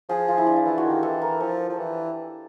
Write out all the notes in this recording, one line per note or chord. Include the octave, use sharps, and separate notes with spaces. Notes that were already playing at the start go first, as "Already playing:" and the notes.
F3 G#4
F4
E4
D4
E4
E3 F4
F#4
D#3
G4
E3 A4
A#4
F3 A4
F3
E3